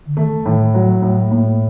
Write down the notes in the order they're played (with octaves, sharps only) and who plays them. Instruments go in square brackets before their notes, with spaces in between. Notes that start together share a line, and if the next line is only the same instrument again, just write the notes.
[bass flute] D3
[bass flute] D#3 [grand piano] A3
[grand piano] A2 [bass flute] D#3
[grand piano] F#3
[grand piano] A2 [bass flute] A3
[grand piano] A2 [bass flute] A#3